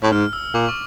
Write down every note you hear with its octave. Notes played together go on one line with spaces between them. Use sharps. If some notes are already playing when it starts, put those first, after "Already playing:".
A2
G#2 F6
E6
A#2 D6
C#6